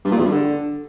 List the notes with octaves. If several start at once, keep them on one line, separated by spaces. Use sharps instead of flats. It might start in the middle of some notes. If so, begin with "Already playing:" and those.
G2
A#2
E2
G2
D3